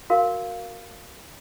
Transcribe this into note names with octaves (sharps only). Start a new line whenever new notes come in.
F#4 A#4 F5